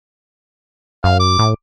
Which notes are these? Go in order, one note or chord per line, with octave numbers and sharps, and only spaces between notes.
F#2 F5
D6
A2